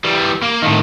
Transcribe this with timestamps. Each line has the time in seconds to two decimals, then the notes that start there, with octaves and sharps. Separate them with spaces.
0.04 E3 G3
0.42 A#3
0.62 A2 D#3